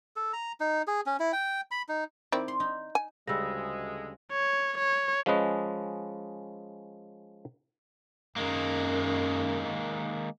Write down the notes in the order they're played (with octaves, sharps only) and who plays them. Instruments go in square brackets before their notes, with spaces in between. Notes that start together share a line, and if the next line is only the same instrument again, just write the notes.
[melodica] A4
A#5
D#4
G#4
C#4
E4
G5
B5
D#4
[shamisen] D#3 C4 E4 [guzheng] D5
[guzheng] C6
D#4
[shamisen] G#5
[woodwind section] D2 G#3 [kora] C#3 G3 [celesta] E6 A#6
[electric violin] C#5
C#5
[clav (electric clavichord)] F3 G#3 C#4 B4 D#5
[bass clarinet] F#2 [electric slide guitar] D#3 G#3 A#3